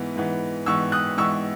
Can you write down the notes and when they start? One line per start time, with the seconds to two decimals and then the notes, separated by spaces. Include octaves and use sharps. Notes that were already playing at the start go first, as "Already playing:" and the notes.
Already playing: G#2 E3 B3
0.16 G#2 E3 B3
0.66 G#2 E3 B3 C#6 E6
0.92 D#6 F#6
1.17 G#2 E3 B3 C#6 E6